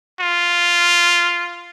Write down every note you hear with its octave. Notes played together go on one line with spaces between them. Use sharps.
F4